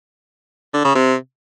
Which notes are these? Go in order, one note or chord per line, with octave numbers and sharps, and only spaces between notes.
D3
C#3
C3